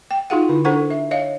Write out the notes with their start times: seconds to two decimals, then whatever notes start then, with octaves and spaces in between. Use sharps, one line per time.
0.11 G5
0.30 D#4 F4 F#4 G#4 F5 F#5
0.49 D3 E4
0.65 D4 A4 C5 F#5 C#6
0.90 E5
1.11 C#5 D#5 F5